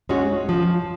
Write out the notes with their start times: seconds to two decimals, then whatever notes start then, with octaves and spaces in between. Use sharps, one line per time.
0.09 G#3 C#4 F#4
0.49 F3